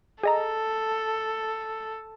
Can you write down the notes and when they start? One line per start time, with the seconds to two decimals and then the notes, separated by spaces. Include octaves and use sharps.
0.23 G#4 A4 D#5 A#5